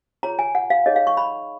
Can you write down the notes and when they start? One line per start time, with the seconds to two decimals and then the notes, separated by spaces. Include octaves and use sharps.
0.23 F4 G#4 C#5 A#5
0.39 G#5
0.55 F#5
0.70 F5
0.86 D#4 G#4 C#5 D#5
0.96 F5
1.07 C#6
1.17 B5